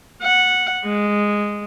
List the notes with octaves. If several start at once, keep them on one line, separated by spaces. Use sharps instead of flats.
F#5
G#3